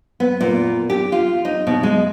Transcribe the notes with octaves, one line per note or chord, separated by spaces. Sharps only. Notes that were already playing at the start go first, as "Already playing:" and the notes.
B3
A#2
G4
F4
D#4
B2
G#3